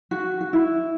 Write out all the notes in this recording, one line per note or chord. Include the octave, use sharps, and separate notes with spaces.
F#4
F#4
E4